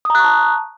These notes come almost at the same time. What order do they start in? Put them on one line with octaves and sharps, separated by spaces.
D#6 A#5 F#6 C#6 A5